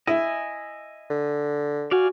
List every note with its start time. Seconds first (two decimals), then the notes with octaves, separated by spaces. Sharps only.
0.07 E4 D#5 G#5
1.10 D3
1.91 F#4 D5 F5 G#5